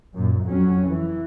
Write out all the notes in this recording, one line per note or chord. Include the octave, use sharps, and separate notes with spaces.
F#2 A#2
F2 F#3 C#4
E3